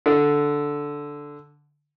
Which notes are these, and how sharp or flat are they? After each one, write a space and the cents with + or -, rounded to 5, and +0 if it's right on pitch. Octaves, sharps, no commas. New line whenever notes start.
D3 -5